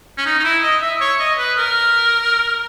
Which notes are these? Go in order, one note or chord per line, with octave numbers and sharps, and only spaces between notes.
C#4
D#4
D#4
E4
D#5
E5
C#5
D#5
B4
A#4